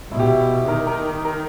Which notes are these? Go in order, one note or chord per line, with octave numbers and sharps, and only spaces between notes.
B2 E4
G4
E4
E4
D#3 A#4
A#4
A#4